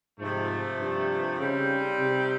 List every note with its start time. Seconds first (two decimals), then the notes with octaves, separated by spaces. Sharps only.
0.18 G#2 C3 F3 A3
0.79 G2
1.39 C#3 G3 C4 D#4
2.00 C3